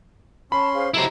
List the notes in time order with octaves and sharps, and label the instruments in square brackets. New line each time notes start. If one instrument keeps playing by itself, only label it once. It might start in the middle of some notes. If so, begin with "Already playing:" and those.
[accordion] C#4 C6 [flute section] A5 [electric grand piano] B5
[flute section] G#4 C5 F5
[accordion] F#3 A4 [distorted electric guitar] E4 C5 [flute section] G4 D#5 A#5